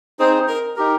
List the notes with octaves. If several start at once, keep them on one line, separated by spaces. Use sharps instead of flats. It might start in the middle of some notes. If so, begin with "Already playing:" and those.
C4 D#4 G#4 C5
A#4
D#4 G4 A#4